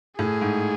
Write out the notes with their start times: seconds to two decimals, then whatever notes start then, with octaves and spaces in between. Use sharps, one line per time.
0.18 A2 G#4
0.41 G#2